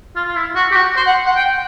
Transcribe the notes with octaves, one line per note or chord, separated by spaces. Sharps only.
F4
F4
E4
F#4
G4
F#4
C5
F#5
F#5
G5